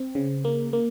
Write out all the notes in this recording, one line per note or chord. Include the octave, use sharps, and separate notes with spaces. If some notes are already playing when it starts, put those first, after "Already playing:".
Already playing: C4
C#3
A#3
A#3